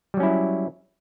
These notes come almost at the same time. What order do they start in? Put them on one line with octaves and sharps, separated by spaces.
G3 F#3 C#4 E4